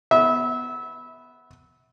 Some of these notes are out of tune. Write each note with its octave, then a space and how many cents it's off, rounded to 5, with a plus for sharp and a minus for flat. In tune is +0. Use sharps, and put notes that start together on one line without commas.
B3 +0 E5 -25